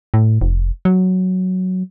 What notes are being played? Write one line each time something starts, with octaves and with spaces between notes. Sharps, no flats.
A2
F1
F#3